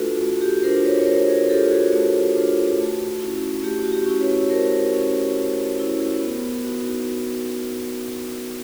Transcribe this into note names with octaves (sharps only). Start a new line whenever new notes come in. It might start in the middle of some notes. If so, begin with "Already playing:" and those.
Already playing: A3 D4 F4 F#4 A4 B4
A3 F#4
G4
D4 F4 A#4 C5
B4 C#5
C#5
A3 A#4 C5
G#4 A#4
D4 F4 G4 A4
F#4 G#4
A3
D4 F4
A3
C#4 E4
A3 G4
F#4
G4
C#4 E4
B4 C#5
A3 A#4 C5
C#4 E4
A3
C#4 E4
B3
D#4 F#4